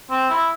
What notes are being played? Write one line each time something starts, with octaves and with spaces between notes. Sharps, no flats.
C4
E4